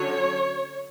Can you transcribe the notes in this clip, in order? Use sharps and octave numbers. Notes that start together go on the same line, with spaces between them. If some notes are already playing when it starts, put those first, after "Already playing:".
Already playing: D3 F#3 C#4 C#5